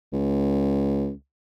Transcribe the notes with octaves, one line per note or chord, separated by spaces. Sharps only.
C#2